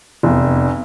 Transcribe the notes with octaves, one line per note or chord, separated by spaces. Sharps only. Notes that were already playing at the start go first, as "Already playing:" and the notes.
F1 E2